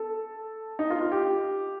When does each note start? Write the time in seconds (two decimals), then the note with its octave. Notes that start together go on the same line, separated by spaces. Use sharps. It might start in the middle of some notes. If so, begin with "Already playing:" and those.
Already playing: A4
0.79 D#4
0.90 F4
1.00 F4
1.12 G4